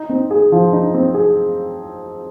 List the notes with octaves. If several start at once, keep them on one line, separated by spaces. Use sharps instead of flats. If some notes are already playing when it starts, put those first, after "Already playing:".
Already playing: D#4
C4
G#4
F3
D#4
C4
G#4